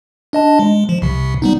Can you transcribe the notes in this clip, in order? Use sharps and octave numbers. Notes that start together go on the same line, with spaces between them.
D4 D#5 A5
G#3
F3
C2 C3
G3 B3 D#4